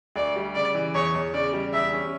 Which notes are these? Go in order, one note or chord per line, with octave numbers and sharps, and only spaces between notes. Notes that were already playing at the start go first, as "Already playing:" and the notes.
D2 D5
G3
C#3 D5
E3
E2 C#5
E2
C#3 D5
G3
E2 E5
C#4